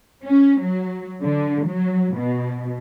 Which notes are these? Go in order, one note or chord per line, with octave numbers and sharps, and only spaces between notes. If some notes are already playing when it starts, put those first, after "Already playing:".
C#4
F#3
D3
F#3
B2